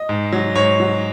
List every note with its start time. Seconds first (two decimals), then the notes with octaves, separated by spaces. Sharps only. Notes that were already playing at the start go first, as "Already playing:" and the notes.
Already playing: D#5
0.09 G#2
0.32 F#3
0.55 G#2 C#5
0.80 F#3